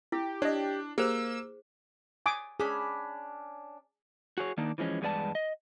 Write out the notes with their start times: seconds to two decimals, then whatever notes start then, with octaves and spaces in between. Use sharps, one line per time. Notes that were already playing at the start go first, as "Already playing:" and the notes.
0.12 E4 G4
0.42 D4 C#5 D#5
0.98 A#3 G4 G#4 C5 E6
2.26 G#5 D6 D#6
2.60 C#4 D4 G#4 B5
4.38 F#4 G#4 C#5
4.57 D#3 A#3 D4 D#4
4.78 E3 F3 G#3 C#4
5.01 E2 G2 G#3 B3 D5 A5
5.35 D#5